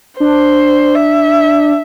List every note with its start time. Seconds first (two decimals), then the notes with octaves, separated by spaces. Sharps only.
0.20 D4 C5
0.95 E5